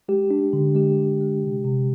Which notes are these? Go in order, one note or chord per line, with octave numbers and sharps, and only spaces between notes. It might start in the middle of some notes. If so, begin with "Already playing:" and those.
G#3 G4
D4
D3
G#3 G4
D3
G#3
C3
C3